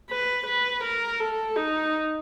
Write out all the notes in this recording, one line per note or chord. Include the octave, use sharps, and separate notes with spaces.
B4
B4
A#4
A4
D#4